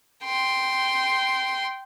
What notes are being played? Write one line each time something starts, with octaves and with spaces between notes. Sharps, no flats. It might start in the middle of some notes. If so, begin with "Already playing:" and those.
G5 C6